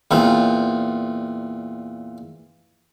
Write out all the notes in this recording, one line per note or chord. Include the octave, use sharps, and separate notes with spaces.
E2 A#2 C4